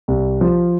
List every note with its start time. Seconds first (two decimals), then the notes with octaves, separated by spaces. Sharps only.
0.08 C2
0.41 F3